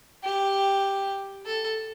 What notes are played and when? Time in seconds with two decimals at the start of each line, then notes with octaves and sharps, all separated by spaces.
0.24 G4
1.46 A4